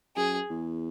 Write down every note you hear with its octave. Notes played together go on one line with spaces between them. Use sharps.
F#2 G#4
E2